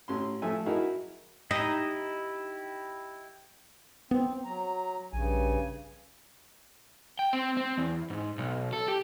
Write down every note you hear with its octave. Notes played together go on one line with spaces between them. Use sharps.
A1 C#4 C6
F3 A3 A4 E5 G#5
F#3 D#4 E4 F#4 G#4 A#4
D#4 E4 G4 D#5
B3 C4
F#3 A#5
A#1 G2 C#3 G#5
G5
C4
C4
E2
G#2
B1
A4
G4